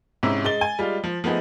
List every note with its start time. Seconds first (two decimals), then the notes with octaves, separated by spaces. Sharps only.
0.23 G#2 C3 C#4 E4
0.45 G#3 A6 G7
0.61 G#5
0.79 G3 G#3 F4
1.04 F3
1.24 F3 A3 B3 D#4 G#4